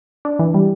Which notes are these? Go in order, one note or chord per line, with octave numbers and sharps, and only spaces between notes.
D4
E3
G3